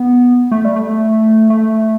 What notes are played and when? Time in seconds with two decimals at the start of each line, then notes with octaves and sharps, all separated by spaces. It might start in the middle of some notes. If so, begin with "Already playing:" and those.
Already playing: B3
0.52 A3
0.65 G3
0.76 A3
1.50 A3